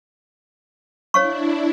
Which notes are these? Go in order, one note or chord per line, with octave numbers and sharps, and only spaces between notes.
D4 E4 C#5 F5 C#6